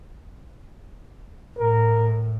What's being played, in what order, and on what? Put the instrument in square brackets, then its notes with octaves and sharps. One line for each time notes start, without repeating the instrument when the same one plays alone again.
[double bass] A2 [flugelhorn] A#4